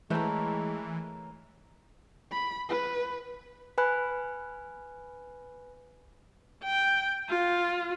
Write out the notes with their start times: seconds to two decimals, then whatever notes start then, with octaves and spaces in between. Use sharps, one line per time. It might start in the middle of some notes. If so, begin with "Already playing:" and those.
0.10 E3 G#3 A3 A#4 B4 C#5 G5
2.32 B5
2.69 B4
3.78 B4 G#5 B5 F#6
6.64 G5
7.29 F4